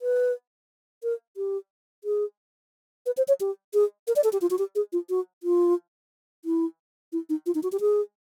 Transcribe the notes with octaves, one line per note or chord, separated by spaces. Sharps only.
B4
A#4
G4
G#4
B4
C5
C#5
G4
G#4
A#4
D5
A4
G4
F4
F#4
G4
G#4
F4
F#4
F4
E4
E4
D#4
F4
D#4
F#4
G4
G#4